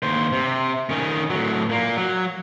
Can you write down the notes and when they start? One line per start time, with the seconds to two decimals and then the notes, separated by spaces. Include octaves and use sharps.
0.03 D#2 C5
0.32 C3
0.89 D#3 C#4
1.30 A2 F#3
1.69 A#2 A#3
1.97 F#3